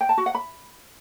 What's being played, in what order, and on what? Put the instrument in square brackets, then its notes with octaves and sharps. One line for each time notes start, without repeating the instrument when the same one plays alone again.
[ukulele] G5
A5
F#4
F#5
B5